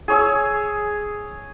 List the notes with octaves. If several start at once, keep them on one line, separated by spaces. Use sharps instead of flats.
G#4 C#5 E6